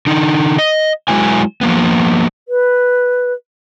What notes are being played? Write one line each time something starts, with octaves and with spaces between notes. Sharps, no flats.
D3 D#4
D#5
F#3 G#3 E4 B4 G#5
F3 A#3 B3
B4